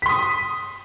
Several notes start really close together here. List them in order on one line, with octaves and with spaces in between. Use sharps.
B6 C6 D#6